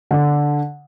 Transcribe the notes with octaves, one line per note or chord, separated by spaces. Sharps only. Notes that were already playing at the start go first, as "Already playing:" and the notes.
D3